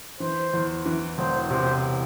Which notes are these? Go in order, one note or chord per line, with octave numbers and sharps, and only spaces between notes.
E3 C5
E2
E3
E1 C5
C3 C5